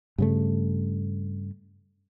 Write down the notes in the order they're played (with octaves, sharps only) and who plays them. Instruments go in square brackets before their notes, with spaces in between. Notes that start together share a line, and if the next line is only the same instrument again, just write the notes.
[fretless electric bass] G2 C#3 A3